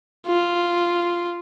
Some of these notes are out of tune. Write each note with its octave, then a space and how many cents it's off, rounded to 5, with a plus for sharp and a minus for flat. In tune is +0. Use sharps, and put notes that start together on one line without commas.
F4 -5